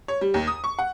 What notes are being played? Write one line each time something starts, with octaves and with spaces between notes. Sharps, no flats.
C#5
G3
D#2
D#6
C#6
F#5